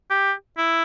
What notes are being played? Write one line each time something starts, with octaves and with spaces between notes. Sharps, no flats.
G4
E4